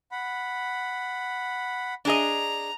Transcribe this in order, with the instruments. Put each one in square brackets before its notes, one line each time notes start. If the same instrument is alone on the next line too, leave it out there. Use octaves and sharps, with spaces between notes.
[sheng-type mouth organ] F#5 B5
[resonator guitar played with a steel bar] D4 G#4 D#5 [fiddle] A#5